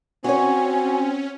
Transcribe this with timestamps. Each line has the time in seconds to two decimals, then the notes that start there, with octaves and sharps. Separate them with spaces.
0.24 C4 C#4 F#4 C#5 G#5